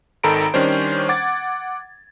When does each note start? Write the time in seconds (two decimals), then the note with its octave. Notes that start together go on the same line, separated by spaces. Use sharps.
0.24 G#1 D#3 A4 A#5 B5 D7
0.54 D#3 G3 C#4 D4 C5
1.09 F#5 D6 G#6 A6